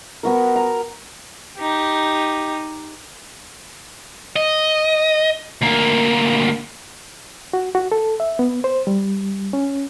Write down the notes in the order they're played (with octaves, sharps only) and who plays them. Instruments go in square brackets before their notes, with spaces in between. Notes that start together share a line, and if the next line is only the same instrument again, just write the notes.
[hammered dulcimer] B3 F#4 A#4
A#5
[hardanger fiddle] D#4 G4
[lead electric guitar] D#5
D2 A#3
[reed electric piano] F#4
F#4
A4
E5
B3
C5
G3
C#4